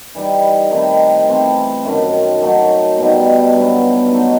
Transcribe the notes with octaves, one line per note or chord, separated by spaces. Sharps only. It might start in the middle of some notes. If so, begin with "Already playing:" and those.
E3 G3 D#4
C3 D#3 A3 E4
C3 E3 A3 C4
F#2 D#3 A3
F#3 A3 D#4
B2 G3 D#4
G2 F#3 B3
F#3 A3 D#4